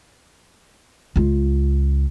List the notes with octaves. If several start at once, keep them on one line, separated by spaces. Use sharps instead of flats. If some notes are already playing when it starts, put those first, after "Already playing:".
C#2 F4